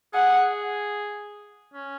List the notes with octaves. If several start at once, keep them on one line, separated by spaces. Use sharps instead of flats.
G#4 F#5
C#4